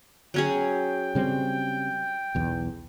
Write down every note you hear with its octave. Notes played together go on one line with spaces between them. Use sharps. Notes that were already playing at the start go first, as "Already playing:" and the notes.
F#3 C#4 G#4 G5
C#3 G3 C4
B1 E2